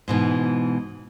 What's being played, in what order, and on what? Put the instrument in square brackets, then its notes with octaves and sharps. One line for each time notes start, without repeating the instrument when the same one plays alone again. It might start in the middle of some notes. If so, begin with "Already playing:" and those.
[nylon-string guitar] G#2 B2 E3